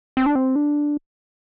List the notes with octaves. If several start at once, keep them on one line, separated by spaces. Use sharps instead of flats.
C4
D4
C4
D4